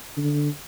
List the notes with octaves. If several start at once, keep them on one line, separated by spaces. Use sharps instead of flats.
D3